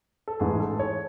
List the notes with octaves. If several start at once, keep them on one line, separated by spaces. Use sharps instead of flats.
A4
A1 G#2 E3 G#4
A4
C#5